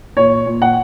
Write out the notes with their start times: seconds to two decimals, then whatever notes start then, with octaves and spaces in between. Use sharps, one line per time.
0.17 A#2 C#5
0.46 A#2
0.62 F#5